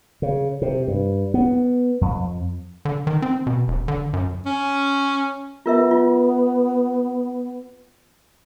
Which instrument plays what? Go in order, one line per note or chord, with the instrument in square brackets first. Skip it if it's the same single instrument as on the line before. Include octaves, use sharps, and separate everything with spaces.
[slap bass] C#3
C3
G2
B3
F2
[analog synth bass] D3
D#3
C4
B2
E1
D3
F#2
[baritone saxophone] C#4
[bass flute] B3 [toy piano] F4 A#4 E5
[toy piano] F4